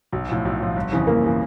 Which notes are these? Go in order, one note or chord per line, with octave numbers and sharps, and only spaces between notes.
B1
A2 F3
B1
A2 F3
G1
F2 C#3 E3
G1 A#3
C#3 E3